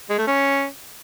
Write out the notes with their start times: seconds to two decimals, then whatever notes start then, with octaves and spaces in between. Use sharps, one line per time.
0.10 G#3
0.18 A3
0.27 C#4